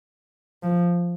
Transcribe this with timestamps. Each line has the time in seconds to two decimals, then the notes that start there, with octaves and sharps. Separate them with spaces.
0.63 F3